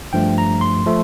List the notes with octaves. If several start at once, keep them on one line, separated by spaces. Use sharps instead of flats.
G2 F3 A3 G5
A#5
C6
F3 A3